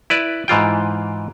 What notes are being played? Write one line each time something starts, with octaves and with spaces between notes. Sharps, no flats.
E4 B4 D5
G#2 E3 F4 G5